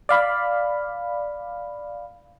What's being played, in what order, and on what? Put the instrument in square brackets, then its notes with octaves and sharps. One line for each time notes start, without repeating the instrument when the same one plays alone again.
[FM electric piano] D5 F5 B5